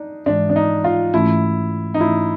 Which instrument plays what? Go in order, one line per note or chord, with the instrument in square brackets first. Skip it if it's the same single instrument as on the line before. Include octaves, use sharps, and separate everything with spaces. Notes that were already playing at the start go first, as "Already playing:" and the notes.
Already playing: [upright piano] D4 D#4
[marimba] G#2 E3 G#3 [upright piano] D4
[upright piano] D4
D#4
F4
[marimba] G#2 E3 A3 C#4 F4 [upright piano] E4
[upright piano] D#4
[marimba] G#2 E3 A3 C#4 F4 [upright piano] E4